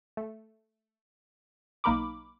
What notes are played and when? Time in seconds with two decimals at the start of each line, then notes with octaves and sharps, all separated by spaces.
0.17 A3
1.84 B1 A#3 D#4 A#4 B5 D6